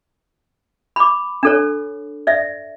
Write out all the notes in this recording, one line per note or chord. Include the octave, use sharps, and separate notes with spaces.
B5 D6
D4 A4 C#5
D5 E5